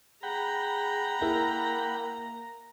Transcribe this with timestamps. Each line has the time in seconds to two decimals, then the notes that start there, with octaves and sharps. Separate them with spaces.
0.23 G#4 F#5 G5 A#5 B5
1.21 A#3 E4 G#4 A#4